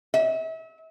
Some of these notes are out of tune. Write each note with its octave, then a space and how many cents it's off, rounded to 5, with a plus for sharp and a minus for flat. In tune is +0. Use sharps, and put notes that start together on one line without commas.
E5 -35